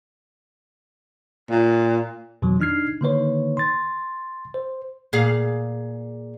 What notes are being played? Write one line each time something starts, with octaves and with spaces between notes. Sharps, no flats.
A#2
F2 B2 D#3 E3 F#3
D4 D#4 F6 G#6 C7
D3 D#3 A#3 D#4 B4 C#5
C6 A6
C5
A#2 G#4 F5